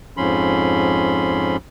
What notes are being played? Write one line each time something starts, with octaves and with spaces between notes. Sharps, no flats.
F2 G#2 F3 C#4 B5 C6